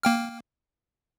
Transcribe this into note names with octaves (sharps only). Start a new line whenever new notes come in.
A#3 G5 F6